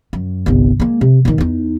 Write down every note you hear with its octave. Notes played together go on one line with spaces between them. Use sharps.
F#2
G1 C2
G#3 A#3
C3
A#2 D#3
E2 D#4